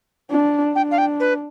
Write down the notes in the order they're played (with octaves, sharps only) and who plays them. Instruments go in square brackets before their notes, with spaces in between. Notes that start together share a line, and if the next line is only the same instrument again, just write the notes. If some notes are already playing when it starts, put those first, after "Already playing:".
[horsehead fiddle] D4
[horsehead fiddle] D4 [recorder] G5
[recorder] F5
G5
B4